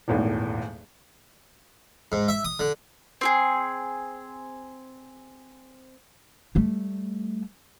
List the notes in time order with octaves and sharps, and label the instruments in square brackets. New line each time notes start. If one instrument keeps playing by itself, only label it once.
[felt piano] D#1 G#1 E2 A2
[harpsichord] G#2
E5
D#6
D3
[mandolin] C4 F#4 G#4
[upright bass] G3 A3